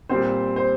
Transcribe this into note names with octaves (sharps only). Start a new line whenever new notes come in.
A#2 G3 C4 C5
C5